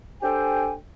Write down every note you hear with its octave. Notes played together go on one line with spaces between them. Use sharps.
D4 G4 A4 C5 G5 G#5